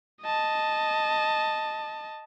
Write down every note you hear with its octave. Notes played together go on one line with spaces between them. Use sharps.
D#5 A5